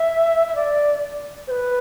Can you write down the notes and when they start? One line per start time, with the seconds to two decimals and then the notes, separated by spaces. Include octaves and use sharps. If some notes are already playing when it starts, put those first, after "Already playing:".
Already playing: E5
0.47 E5
0.55 D5
1.47 C5
1.51 B4